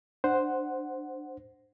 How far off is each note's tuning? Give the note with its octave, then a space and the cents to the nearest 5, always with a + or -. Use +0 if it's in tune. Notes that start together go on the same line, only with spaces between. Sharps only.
D4 +15 C5 +0 F#5 +0